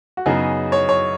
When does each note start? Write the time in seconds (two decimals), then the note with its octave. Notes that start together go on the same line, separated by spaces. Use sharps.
0.17 F#4
0.26 F#2 C#3 B3 D#4 G#4
0.72 C#5
0.89 C#5